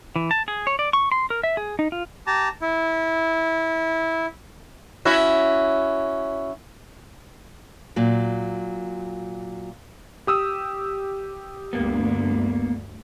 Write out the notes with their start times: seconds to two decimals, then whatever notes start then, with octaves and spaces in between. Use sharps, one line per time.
0.16 E3
0.31 A5
0.48 G#4
0.67 C#5
0.79 D5
0.93 C#6
1.12 C6
1.30 A#4
1.43 E5
1.57 G#4
1.79 D#4
1.92 F4
2.27 G4 A5 A#5
2.62 E4
5.05 C#4 E4 F#4
7.96 A#2 F#3
10.27 G4 D#6 E6
11.73 D2 G2 A#3 B3